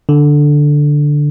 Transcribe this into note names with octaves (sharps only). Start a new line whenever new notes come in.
D3